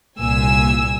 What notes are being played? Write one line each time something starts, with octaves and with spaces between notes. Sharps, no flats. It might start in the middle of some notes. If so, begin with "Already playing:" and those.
C2 A#2 G#5 E6